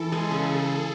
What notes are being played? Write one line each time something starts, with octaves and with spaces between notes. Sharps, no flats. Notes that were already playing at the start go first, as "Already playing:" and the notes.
Already playing: E3 A4
G#3 G#4
C#3